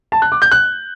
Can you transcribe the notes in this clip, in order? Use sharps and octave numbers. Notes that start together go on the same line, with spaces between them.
A5
F#6
D6
G6
F#6